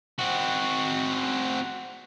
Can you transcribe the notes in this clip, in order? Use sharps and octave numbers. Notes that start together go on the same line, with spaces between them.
C4 F#4